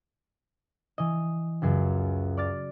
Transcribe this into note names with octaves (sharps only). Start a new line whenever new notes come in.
E3 D#5
C#2 F#2 G#4
D5 D6 F6 A6